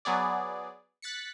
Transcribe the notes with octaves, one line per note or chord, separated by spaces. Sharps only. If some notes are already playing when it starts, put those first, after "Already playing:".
F#3 B3 G#4 D5
F#6 A6 B6 C#7